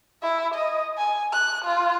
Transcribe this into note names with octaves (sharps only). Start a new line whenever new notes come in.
E4
D#5
G#5
F#6
F4